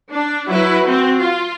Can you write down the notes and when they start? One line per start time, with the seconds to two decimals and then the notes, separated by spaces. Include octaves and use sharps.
0.12 D4
0.47 F#3 E4 F#4 B4
0.87 C4
1.20 F4